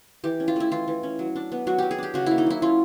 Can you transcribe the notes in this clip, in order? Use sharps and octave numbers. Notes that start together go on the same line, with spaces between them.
E3 G4
C#4
F4
A3 E4
E3 F4
E3
C#4
F#3
D4
B3
F#3 F#4
F#3 G4
G#4
D4 G4
C#3 F#4
A#3 E4
D#4
F#3 E4
C#4 F4